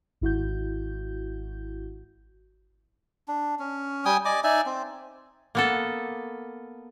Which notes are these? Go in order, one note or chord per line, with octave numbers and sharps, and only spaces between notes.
G#1 E4 F#4 G6
D4
C#4
G3 G5 G#5 D#6
D5 D#5 G#5 D6
D#4 D5 E5 G#5
C4
A#3 B3 A4